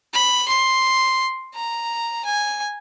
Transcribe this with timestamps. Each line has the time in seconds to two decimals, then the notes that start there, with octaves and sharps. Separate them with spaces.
0.13 B5
0.48 C6
1.55 A#5
2.25 G#5